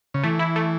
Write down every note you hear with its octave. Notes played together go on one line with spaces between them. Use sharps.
C#3
E3 A3
E4
A3